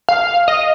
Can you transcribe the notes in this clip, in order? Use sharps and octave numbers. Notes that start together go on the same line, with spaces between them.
F5
D#5